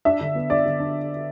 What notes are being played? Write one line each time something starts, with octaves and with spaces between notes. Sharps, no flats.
D4 E5
D3
B3
D3 D5
D3
D4